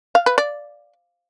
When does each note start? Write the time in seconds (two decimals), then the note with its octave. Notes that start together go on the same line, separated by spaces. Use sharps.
0.15 F5
0.26 B4
0.38 D5